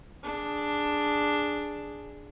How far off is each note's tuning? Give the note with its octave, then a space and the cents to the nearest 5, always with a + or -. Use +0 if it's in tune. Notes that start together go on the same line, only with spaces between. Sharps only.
D4 +0 G#4 +0